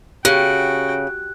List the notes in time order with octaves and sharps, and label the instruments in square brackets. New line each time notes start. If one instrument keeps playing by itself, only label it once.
[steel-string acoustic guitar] C#3 [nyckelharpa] F#4 G5 [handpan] G4 [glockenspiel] F#6